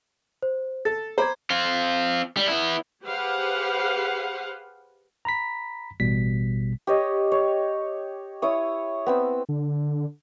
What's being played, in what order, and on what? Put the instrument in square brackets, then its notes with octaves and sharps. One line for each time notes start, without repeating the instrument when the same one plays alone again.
[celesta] C5
[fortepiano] A4 [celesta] A6
[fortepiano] C5 B5 D6 [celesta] A#5 G#6
[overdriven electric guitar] C4 F4
G3
B3 E4
[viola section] G4 G#4 B4 C5 F5 F#5
[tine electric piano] A#5 B5 B6
A1 B2 G3 B6
[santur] G4 C#5 D#5
C#5
E4 C#5 D#6
B3 C4 E6
[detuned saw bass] D3